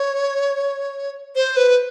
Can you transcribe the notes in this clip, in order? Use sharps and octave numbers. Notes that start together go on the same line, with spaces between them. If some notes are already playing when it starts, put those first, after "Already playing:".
Already playing: C#5
C5
B4